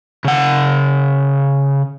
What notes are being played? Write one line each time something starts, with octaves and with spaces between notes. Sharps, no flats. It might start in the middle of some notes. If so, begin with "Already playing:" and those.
C#3 F#5